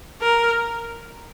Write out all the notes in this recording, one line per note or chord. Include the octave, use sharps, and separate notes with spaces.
A#4